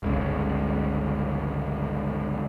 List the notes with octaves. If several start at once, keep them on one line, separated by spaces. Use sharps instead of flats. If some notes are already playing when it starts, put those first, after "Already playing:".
G1 C#2 C#3